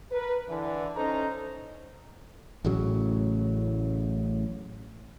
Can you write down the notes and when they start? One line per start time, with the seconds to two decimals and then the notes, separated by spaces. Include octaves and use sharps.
0.11 A#4 B4
0.49 D3 E3
0.96 C#4 D#4 A4 C5 A#5
2.65 A1 A2 C#3 F#3